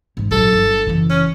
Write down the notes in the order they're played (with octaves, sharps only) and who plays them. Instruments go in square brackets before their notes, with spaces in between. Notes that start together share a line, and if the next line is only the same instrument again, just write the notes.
[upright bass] G#2 G#3
[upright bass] A#1 F#3 [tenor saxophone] A4
[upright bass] G1
F#1 E3
[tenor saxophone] C#4